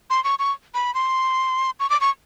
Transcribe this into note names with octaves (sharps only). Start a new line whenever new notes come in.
C6
C#6
C#6
B5
C6
C#6
D6
C#6